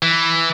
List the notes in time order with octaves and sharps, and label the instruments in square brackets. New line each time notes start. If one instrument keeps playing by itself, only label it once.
[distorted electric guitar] E3